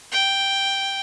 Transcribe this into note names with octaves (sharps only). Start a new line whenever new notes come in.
G5